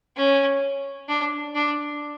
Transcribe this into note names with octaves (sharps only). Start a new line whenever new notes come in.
C#4
D4
D4